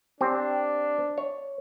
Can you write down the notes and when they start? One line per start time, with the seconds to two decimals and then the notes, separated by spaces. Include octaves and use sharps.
0.21 C4 D4 G4 C5
1.18 C#5